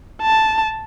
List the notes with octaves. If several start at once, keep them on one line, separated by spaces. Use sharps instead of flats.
A5